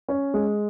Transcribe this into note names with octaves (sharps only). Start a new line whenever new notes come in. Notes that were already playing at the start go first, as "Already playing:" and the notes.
C#4
G#3